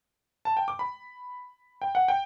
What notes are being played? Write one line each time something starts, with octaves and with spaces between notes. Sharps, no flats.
A5
G5
D6
B5
G5
F#5
G5